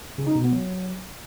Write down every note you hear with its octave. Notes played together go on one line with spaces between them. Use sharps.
C#3
D#4
B2
B3
F#3